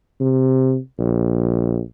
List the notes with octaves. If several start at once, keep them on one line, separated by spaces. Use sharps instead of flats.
C3
A#1